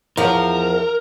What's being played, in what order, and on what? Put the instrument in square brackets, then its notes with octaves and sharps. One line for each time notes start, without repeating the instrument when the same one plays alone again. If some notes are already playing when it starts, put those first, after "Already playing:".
[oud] E2 F3 [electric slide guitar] A#4